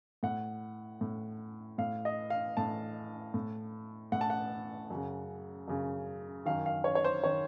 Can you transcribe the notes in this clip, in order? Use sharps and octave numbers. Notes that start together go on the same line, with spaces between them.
A2 F#5
A2
A2 F5
D#5
F5
A2 A5
A2
A2 F#5
A5
F#5
F#2 C#3
F#2 C#3
F#2 D#3 F5
F5
C#5
C#5
C5
D#3 C#5